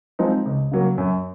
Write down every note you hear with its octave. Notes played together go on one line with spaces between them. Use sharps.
F3 G#3 C4 D#4
C#2
C#3 F#3 A#3
F#2